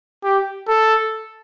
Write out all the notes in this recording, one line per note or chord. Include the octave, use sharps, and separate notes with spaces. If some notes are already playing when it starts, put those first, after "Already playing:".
G4
A4